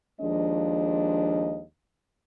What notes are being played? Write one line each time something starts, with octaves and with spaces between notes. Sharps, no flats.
D#2 F3 G#3 D4 D#5